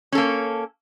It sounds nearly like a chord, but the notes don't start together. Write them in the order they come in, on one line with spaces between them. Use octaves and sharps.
C#4 A4 A#3